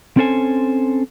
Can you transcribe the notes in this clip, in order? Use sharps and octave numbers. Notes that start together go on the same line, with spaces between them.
C4 C#4 A4 C5 G#5